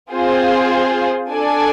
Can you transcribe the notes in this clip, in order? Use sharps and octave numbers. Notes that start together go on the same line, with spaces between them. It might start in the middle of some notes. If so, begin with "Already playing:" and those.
C4 F4 G#4 C5
D4 A4 D5 G#5